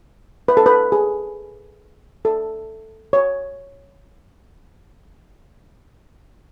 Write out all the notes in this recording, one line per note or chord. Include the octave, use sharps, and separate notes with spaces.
B4
A4
B4
G#4
A4
C#5